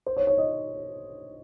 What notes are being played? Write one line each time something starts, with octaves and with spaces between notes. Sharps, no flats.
C5
C#5
C#5
D#5